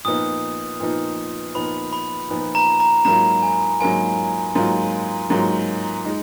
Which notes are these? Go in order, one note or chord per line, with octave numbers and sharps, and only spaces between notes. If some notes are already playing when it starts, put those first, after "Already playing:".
A#2 F3 B3 D#4 D#6
A#2 F3 B3 D#4
A#2 F3 B3 D#4 B5
B5
A#2 F3 B3 D#4
A#5
A#5
G#2 F#3 A#3 F4 A#5
G#5
G#2 F#3 A#3 F4 G#5
G#2 F#3 A#3 F4
G#2 F#3 A#3 F4
G#3 D#4